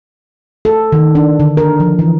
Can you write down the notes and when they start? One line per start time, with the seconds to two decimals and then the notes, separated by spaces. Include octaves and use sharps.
0.65 A4
0.92 D#3
1.15 D4
1.40 D3
1.57 A#4
1.80 F3
1.99 E3